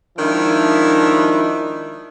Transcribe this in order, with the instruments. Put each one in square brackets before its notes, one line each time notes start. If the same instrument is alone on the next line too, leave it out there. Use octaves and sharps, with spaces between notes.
[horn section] D#3 F3 G#3 D4 E4